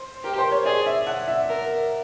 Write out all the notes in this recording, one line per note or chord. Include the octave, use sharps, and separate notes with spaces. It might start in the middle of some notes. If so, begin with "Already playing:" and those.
Already playing: C5
G4 A#4
C5
C#5
G#4 D5
E5
F#5
E5
A#4